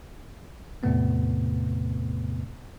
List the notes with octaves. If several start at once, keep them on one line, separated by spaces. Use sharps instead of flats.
E2 A2 C3 A3 B3 C4